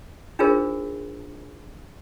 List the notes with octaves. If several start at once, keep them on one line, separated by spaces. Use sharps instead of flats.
D4 D#4 F4 G#4 A#4 C5